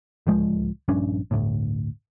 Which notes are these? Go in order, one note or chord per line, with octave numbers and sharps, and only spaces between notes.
D1 C#2 F3 G#3
A#1 G2 C#4 D4
G1 D2 A2